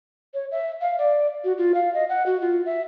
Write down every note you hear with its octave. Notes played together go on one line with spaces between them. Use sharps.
C#5
E5
F5
D5
F#4
F4
F5
D#5
F#5
F#4
F4
E5